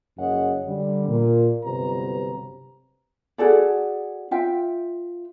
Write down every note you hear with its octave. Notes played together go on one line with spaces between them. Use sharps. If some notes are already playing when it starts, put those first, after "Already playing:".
F#1 F#2 G#4 C#5 D#5 F#5
D3 G3
A#2
G1 C3 F#3 B4 C5 A#5
F#4 G#4 A4 D5
F4 E5 G5